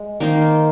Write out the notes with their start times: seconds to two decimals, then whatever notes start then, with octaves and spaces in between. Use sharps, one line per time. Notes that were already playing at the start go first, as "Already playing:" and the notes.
Already playing: G#3
0.20 D#3 A#3 D#4 C5